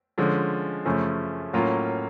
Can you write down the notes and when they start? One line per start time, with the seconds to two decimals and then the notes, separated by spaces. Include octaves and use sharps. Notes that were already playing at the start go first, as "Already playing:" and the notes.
0.18 D3 F3 G#3 C#4
0.85 F#2 C#3 F3 A3 C#4
1.53 A2 F#3 A#3 C#4 F4